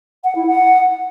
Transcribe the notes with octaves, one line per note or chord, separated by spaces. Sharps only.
F#5
E4
F#5